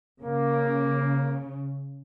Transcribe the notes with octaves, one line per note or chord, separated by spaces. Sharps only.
C#3 A#3